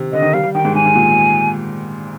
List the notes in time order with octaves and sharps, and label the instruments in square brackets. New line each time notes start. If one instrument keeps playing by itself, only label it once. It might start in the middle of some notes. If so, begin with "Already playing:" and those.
Already playing: [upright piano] C3 D#3
[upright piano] D3 [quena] D#5
[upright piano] D#3
[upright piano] G3 [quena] F5
[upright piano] G3
[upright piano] D#3 [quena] G5
[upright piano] G#2
[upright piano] G#2 [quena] G#5
[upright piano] G#2
A#2